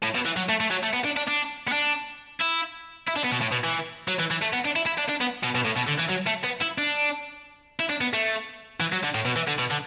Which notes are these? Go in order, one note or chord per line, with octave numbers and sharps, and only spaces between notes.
A2
B2
E3
F#3
A3
A3
F#3
A3
B3
D4
D4
D4
B3
D4
E4
E4
D4
B3
B2
A2
B2
E3
F#3
E3
E3
A3
B3
D4
E4
E4
D4
D4
B3
B2
B2
A2
B2
D3
E3
F#3
A3
B3
E4
D4
E4
D4
B3
A3
E3
F#3
D3
A2
B2
E3
D3
B2
D3